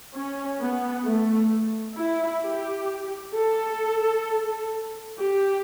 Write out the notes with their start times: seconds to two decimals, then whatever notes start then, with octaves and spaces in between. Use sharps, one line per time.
0.14 C#4
0.59 B3
1.05 A3
1.97 E4
2.43 G4
3.34 A4
5.18 G4